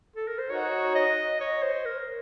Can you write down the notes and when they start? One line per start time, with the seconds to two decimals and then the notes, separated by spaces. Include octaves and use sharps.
0.16 A4
0.28 A#4
0.39 C5
0.50 D#4 F#4 C#5
0.95 D#5
1.40 C#5
1.63 C5
1.85 A#4